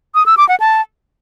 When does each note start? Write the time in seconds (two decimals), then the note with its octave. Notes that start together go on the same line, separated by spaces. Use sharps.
0.15 D#6
0.26 E6
0.37 D6
0.49 F#5
0.60 A5